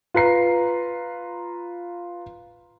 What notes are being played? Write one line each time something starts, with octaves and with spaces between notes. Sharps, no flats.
F4 B4 A#5 C7